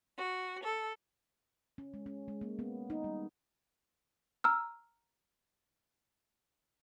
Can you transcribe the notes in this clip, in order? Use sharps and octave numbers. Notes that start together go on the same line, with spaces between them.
F#4
A4
C#4
G#3
C#4
G#3
A#3
B3
D#4
G3
A#5 E6 F6